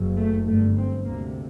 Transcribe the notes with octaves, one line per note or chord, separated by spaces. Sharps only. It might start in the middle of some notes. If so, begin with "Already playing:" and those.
Already playing: F#1 F#2
A3
G1 G2 A3
C4
D2 C3 A#3